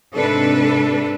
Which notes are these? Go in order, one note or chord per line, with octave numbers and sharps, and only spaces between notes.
G#2 C3 D4 A4 B4